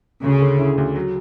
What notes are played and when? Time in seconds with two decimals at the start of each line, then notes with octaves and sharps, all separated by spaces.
0.24 D2 C#3
0.42 D3
0.59 E4
0.78 D2
0.96 F#3